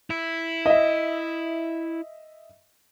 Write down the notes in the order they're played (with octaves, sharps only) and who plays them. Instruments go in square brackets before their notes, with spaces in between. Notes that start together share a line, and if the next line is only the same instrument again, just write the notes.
[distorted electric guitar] E4
[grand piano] D#5 E5